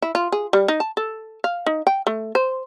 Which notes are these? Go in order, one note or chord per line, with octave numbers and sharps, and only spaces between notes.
E4
F4
G#4
G3
D#4
A5
A4
F5
D#4
G5
A3
C5